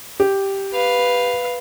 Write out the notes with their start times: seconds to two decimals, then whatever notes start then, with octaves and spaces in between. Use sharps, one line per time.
0.20 G4
0.72 B4 F5